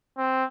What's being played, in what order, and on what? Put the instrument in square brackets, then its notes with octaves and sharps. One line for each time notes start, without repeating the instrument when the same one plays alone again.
[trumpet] C4